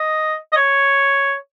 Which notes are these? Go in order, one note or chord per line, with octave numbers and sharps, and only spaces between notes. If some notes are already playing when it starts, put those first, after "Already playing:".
Already playing: D#5
D#5
C#5